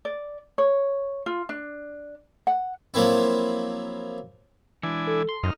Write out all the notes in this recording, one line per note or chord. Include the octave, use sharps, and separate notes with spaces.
D5
C#5
F4
D4
F#5
F3 F#3 A#3 C4 E4
E3 G#3 D4 E4 G#5
A4
C6
F#2 D#4 F6